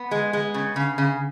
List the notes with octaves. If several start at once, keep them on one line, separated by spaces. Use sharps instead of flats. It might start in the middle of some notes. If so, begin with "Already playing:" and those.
Already playing: B3
G#3
G#3
C#3
C#3
C#3